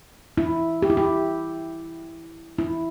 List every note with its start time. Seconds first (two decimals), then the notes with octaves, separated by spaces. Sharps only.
0.38 E4
0.82 G4
0.90 E4
0.97 G4
2.58 E4